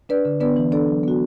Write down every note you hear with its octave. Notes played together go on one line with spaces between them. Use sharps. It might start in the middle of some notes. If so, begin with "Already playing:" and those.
D4 B4 D5
D3
B3 D4 B4 D5
E3
D4 A4 D5
F#3
B3 F#4